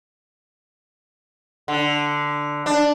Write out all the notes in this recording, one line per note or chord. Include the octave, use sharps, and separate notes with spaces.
D3
D4